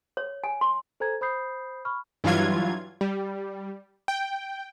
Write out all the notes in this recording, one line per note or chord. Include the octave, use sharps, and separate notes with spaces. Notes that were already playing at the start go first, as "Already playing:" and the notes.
C#5
G#5
C6
A4 C5 G#5 A#5 G#6
C5 B5 D#6 G6 C7
B5 C#6 F6
G2 E3 F#3 F4 G#6
G3
G5